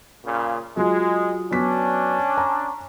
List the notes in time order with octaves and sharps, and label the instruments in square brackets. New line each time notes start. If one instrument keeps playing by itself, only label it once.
[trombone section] A#2 C#3
[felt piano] F#3 F4 [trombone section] G#3
[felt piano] F#3 B3 B6 [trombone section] C#4 D4
[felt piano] A5 A#5